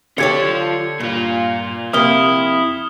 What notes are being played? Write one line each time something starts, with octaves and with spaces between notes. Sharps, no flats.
D3 F4 G4 C#5 A5 G#6 C#7
G2 A#2 F4
F2 C3 A#3 E4 D#6 F6 G7